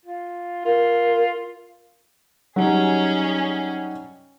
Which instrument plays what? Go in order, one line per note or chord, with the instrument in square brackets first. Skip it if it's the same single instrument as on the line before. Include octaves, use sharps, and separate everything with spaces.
[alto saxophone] F4
[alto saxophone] F4 [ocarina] A#4
[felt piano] F#3 G3 D#4 [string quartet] C#4 G#4